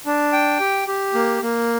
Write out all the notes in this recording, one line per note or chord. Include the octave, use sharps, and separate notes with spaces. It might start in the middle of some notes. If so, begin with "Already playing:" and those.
D4
G5
G4
G4
A#3
A#3